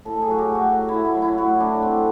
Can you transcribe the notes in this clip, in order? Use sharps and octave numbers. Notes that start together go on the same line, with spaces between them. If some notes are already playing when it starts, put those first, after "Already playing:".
A2 A4
G#4
F#3 F#4
G4
A2
F#4
F#3
E4
A2
E4
F#3
E4
A2 F#4
F#3 D4
A2 C4